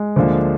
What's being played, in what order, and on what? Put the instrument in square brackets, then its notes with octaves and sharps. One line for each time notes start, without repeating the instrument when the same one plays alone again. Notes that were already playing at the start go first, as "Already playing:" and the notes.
Already playing: [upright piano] G#3
[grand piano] D2 D3 F3 A#3 D4